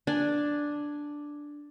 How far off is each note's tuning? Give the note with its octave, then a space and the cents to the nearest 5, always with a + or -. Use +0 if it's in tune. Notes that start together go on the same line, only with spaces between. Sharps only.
D4 +0 G#5 +0